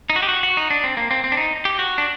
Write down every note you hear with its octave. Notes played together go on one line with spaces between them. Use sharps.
D#4
F#4
G4
F#4
F#4
D#4
D4
C4
A#3
C4
C4
D4
D#4
G4
F#4
D4